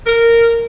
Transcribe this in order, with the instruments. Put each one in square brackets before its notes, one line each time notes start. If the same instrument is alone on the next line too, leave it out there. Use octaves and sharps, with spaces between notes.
[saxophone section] A#4